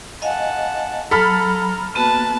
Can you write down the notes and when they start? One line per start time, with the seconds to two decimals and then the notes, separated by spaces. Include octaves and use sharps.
0.22 D#5 F5 F#5 G#5 A5
1.11 F#3 A4 A#5 B5 F6
1.95 A#3 B3 F#4 B4 A5